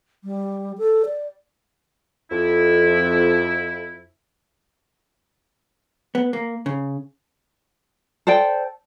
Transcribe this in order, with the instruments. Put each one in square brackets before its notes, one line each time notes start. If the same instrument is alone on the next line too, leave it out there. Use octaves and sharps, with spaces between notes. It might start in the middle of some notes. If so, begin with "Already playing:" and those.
[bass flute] G3
A4
D5
[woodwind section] F2 E4
[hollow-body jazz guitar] B3
A#3
C#3
[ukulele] A4 C5 D5 G5